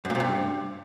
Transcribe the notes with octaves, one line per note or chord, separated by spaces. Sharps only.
F#2
A#2
C3
G2